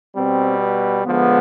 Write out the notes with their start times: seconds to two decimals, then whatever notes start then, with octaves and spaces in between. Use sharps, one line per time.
0.16 B2 G3 C4
0.60 B3
1.05 D3 F3 G#3 B3